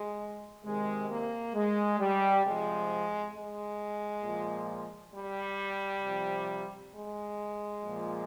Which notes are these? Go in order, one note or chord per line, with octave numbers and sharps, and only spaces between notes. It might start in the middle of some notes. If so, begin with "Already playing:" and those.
Already playing: G#3
C3 D#3 G#3
A#3
G#3
G3
C3 F3 G#3
G#3
A#2 F3
G3
C3 F3
G#3
A#2 F3